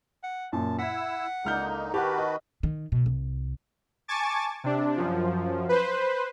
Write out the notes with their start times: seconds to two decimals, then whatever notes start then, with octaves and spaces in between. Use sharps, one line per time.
0.24 F#5
0.52 F#2 A#2 A5
0.79 E4 F#5 E6 B6
1.45 C#2 D3 A#3 D#4 F6 G6
1.94 D#3 F#4 G4 B4 F#5 A5
2.18 D#5
2.63 D#3
2.92 B2
3.06 C2
4.08 G#5 A5 C#6 D6 A6
4.64 C3 D4
4.97 F#2 F3
5.69 B4 C5